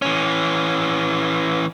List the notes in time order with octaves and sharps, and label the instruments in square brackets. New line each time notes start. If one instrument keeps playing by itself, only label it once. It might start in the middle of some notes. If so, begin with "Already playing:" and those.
[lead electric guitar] E3 C#4